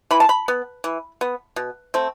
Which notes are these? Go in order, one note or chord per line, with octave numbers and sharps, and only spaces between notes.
E3 B5
A5
B5
B3
E3
B3
B2
A3 C4